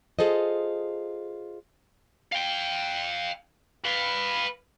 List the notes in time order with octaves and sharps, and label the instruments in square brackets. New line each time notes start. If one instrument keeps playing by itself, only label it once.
[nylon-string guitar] F4 G#4 A4 C5 D#5
[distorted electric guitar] F5 G5
B4 F5